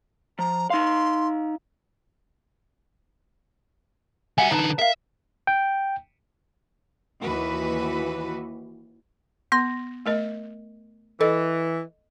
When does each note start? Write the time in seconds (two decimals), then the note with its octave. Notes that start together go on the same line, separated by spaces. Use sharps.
0.39 F3 A#5
0.70 D#4 F5 C6
4.38 G3 F#4 E5 F#5 G#5
4.51 D3 D#4 B4 A5 A#5
4.79 A#4 E5 F5
5.47 G5
7.23 D#2 E3 F#4 B4
9.52 B3 C6 A#6
10.06 A3 A#4 D#5
11.21 E3 A4 D#5